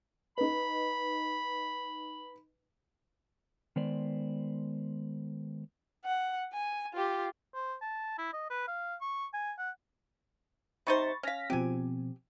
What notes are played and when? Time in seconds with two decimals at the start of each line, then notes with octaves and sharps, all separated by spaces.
0.38 D#4 B4 B5
3.76 D#3 G#3 B3 C5 D5
6.05 F#5
6.53 G#5
6.94 F4 G4
7.54 C5
7.82 A5
8.18 E4
8.33 D#5
8.50 B4
8.68 F5
9.01 C#6
9.33 G#5
9.58 F#5
10.87 C3 D#4 C5 B5 C#6 A6
11.23 C#4 F5 F6 A#6 B6
11.50 B2 F3 C4 G4 G#5